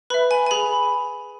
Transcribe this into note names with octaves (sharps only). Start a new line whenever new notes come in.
B4 E5 B5
G#5
G#5
G#4 B5